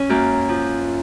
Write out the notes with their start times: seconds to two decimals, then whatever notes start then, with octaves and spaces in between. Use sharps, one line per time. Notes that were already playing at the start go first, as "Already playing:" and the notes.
Already playing: C#4
0.09 F#2 A#3
0.49 F3